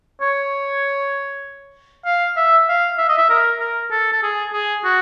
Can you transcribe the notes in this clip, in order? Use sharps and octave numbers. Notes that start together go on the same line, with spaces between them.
C#5
F5
E5
F5
E5
D#5
E5
A#4
A#4
A4
A4
G#4
G#4
F#4